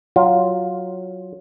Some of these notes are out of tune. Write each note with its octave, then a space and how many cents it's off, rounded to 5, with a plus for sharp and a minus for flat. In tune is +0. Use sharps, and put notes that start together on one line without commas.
F#3 +0 F4 +10